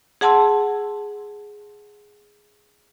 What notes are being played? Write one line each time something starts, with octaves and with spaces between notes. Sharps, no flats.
G#4 F#5 A5 C6 E6